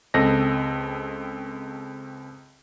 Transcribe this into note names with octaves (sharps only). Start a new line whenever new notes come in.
C#2 C4 A4 D#5 A#6